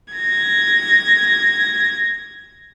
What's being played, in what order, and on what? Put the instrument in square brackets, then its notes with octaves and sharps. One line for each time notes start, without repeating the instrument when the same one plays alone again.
[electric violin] G#6 A#6